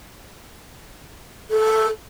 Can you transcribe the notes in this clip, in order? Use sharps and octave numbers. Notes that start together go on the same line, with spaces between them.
A4